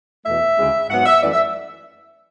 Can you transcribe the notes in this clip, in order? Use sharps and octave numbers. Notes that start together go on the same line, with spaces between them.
E2 B2 A3 E5
D2 C#3 G#3 C#4 E4
G#2 F#3 B3 F#5
E5
F#2 E3 A3 D5
E5